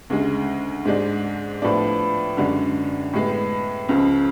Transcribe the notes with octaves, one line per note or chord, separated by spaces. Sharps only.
D2 C#3 G#3
G#2 G#3 D4
A2 F3 B3 D4
F#2 D3 G#3 D4
A2 G#3 B3
C#2 C#3 F3